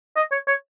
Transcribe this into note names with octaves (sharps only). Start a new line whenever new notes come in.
D#5
C#5
C#5